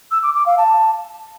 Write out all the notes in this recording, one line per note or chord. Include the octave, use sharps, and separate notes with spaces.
E6
D6
D6
F5
A5